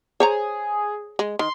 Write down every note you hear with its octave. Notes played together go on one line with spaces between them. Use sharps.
G#4 C5 C#5 A#5
G#3
D#3 C6